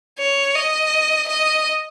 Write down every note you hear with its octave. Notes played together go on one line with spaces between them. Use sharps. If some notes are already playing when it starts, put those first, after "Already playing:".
C#5
D#5
D#5